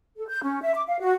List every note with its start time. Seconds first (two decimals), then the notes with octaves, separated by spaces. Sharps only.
0.17 A4
0.28 G6
0.43 C#4
0.62 E5
0.74 D6
0.88 F5
1.00 F#4